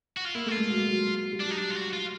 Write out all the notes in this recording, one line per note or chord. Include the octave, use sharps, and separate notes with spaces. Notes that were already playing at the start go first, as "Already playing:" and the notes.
F#4
F4
A#3 E4
A3 F#4
F4
G#3
F#3
F#3
G3
F#3 D4
D#4
D4
F4
F#4
F4